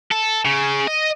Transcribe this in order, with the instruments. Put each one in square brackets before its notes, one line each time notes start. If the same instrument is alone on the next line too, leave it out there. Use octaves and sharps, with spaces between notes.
[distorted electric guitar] A4
C#3
D#5